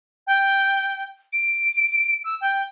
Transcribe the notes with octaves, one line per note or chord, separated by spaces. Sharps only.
G5
D7
E6
G5